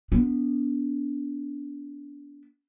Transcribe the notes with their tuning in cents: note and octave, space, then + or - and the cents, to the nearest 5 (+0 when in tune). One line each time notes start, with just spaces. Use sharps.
B3 -5 D4 -30